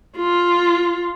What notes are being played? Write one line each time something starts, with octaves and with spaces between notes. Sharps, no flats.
F4